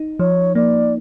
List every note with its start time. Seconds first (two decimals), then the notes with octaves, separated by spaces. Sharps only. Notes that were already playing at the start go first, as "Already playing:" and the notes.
Already playing: D#4
0.19 F3 C#5
0.55 A#3 D5